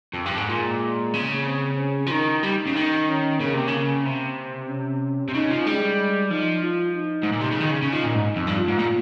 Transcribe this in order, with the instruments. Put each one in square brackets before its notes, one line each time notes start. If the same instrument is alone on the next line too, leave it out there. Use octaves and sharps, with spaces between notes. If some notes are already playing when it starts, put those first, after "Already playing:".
[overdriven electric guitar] F2
G2
G#2
[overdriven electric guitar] A#2 [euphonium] G#3
[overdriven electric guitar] C#3
[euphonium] C4
C#4
[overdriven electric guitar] F3
[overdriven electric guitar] D#3 [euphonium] D#4
[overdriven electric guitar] G3
C#3
D#3
[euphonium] C#4
[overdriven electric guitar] C#3 [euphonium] A#3
[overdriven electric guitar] C3
C#3
[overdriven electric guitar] C3 [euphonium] C4
[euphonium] C#4
[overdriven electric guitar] C3
[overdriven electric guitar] C#3 [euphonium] D#4
[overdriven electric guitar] F3
[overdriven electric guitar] G3 [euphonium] G#3
[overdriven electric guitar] F3 [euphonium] D#4
[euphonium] F4
D#4
[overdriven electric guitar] G#2
A#2
C3
C#3
D#3
C#3
C#3
[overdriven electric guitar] F3 [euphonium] D#4
[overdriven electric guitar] A#2
G#2
F2
G2
[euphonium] F4
[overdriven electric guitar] G#2
A#2